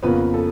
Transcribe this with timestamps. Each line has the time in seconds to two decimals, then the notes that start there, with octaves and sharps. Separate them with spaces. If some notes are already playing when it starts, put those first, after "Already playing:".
0.03 F2 C#3 F3 A#3 B3 B4
0.34 A4